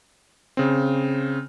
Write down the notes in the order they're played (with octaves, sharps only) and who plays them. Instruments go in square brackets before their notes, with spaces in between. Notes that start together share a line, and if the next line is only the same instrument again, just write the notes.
[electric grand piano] C#3 C4